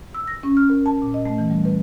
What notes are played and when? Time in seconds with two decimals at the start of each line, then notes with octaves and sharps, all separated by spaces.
0.15 E6
0.27 A#6
0.43 C#4
0.57 F6
0.70 A#4
0.86 A5
1.02 A#2
1.14 D#5
1.25 A3
1.38 E3
1.50 G3
1.65 B4